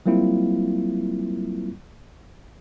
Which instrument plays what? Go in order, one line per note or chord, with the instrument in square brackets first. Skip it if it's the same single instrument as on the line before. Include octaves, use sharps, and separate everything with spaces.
[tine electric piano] F#3 G3 A#3 C4 E4 F4